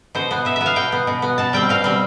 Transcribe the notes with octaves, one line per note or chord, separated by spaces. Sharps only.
B2 C5
B3
B2 E5
B3 E5
F5
B2 G5
B3
B2
B3
B2 A5
G3 C4 G5
B2 F5
G3 C4